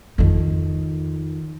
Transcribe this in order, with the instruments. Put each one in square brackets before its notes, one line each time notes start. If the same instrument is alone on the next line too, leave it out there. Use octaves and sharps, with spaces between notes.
[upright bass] F2 D#3